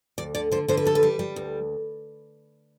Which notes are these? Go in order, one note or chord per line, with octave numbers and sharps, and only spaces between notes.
D2 D5
D3 D5
D3 C5
D3 C5
B4
G3 A4
B4
G3
G3
D2